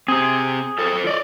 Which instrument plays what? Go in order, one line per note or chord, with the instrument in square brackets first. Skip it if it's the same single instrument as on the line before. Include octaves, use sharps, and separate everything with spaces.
[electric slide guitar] C4 G4 [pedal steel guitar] G#4
[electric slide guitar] F4 A4 C5
D5 D#5